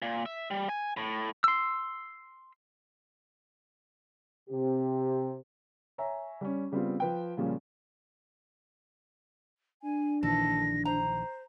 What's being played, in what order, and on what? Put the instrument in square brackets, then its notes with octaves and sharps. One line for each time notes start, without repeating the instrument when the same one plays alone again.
[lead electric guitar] A#2
E5
G3
G#5
A2
[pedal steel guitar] C6 E6
[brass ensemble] C3 G4
[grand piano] C#5 E5 G#5 A#5
G3 C#4
C#3 G3 B3 C4 F4
F3 B4 G5
A#2 C#3 F3 G3 C#4
[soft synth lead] D4 [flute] G#5
[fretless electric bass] A#1 D#3 E3 [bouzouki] A4 [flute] A#6
[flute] C5 [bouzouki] A#5